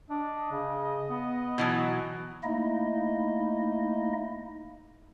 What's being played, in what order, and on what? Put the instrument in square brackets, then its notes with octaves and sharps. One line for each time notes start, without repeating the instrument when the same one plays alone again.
[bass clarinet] D4 [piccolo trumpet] D#5
[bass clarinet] C#3
B3
[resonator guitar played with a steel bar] B2 E3 F#3
[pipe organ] A3 A#3 D#4 E4 D#5